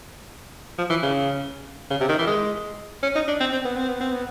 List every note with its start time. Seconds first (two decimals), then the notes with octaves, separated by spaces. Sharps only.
0.78 F3
0.90 E3
1.02 C#3
1.90 C#3
2.00 C3
2.09 D#3
2.19 E3
2.27 G#3
3.03 C#4
3.15 D#4
3.28 D4
3.40 C4
3.53 C4
3.65 B3
3.76 C4
3.88 B3
4.00 C4
4.12 B3